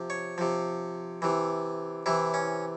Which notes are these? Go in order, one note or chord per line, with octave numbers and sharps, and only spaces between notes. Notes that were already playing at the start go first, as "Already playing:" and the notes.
Already playing: C3 F3
C#5
C3 F3
C3 E3
C3 E3 E4
C#4